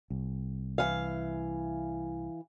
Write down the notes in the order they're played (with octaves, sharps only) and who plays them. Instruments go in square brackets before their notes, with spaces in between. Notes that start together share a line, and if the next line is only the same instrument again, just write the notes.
[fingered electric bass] C2
[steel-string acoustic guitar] E3 F5